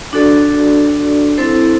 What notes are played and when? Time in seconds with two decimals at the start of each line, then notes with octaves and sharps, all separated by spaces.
0.13 D4 F#4 A4 D5
1.38 C4 E4 A4 C5